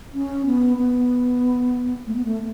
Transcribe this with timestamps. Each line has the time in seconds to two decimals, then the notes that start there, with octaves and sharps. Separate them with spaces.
0.14 C#4
0.46 B3
0.78 B3
2.07 A3
2.16 B3
2.25 A3